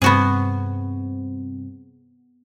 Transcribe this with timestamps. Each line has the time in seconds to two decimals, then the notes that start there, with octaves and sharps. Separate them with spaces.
0.02 G2 C3 B3 C4 F#4 G#4